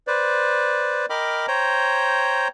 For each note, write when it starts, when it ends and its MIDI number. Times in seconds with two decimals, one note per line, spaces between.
0.07 1.06 71
0.07 1.06 72
0.07 1.06 74
1.10 1.46 70
1.10 1.46 75
1.10 1.46 79
1.10 1.46 83
1.10 1.46 86
1.10 1.46 89
1.48 2.48 72
1.48 2.48 73
1.48 2.48 79
1.48 2.48 82